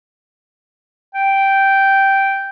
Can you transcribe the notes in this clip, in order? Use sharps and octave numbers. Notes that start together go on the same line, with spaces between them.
G5